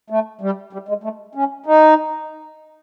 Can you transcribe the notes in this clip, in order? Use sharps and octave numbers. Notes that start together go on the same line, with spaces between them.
A3
G3
G3
G#3
A3
C#4
D#4